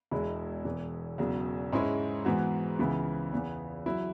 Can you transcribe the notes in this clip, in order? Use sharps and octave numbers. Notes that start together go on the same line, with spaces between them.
E1 E2 B2 G#3 E4
E1 E2 E3
E1 E2 C#3 F#3
G#2 G#3 C#4 E4
G#2 E3 B3 F#4
C#2 C#3 E3 B3 E4
E2 C#3 E3 B3
F#3 E4